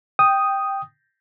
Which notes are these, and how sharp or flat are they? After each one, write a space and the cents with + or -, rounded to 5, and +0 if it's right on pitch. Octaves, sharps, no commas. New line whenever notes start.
G5 +0 D#6 +0